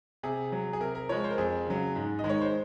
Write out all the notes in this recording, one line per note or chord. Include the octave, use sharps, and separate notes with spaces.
C3 G#4
F#3
G#4
C3 A#4
A#4
F3 G#3 C#5
C5
A#4
F2 G#4
C#3 F#3
G#2
D#5
D#3 G#3
C#5
C5